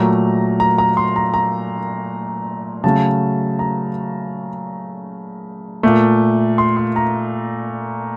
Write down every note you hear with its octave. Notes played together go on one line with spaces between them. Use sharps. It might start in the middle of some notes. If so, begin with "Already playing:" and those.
Already playing: A#2 F#3 A3 A#5
A#5
A#5
C6
A#5
A#5
C#3 F#3 A3 A5
A#5
A#2 A3
C6
C6
A#5